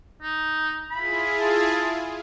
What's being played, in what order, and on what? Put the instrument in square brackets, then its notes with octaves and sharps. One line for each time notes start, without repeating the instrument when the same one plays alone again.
[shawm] D#4
[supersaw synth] E4 F4 G#4 [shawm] B5
[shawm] A5